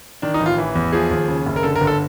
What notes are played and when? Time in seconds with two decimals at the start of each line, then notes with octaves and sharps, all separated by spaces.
0.22 D#3 D4
0.34 D#4
0.40 A1
0.46 F4
0.58 E3
0.75 E2
0.92 F3 G#4
1.10 D#2
1.28 C#3
1.46 F#1
1.56 A#4
1.63 D3 A4
1.76 A#4
1.81 G1
1.87 A4